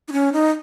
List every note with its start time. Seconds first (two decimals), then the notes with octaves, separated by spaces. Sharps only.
0.08 D#4
0.12 C#4
0.33 D#4